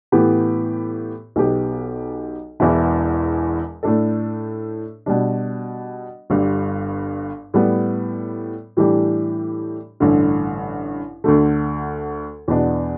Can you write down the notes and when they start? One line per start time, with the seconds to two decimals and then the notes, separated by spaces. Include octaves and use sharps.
0.12 A2 E3 B3 G4
1.36 B1 B2 B3 G4
2.60 E1 E2 E3 B3 E4
3.83 A2 A3 D4 A4
5.06 B2 G3 D4
6.30 G1 G2 G3
7.54 A2 G3 B3
8.77 A2 E3 G3 D4 G4
10.00 A1 G2 D3
11.24 D2 D3 A3
12.48 E2 B2 B3 D4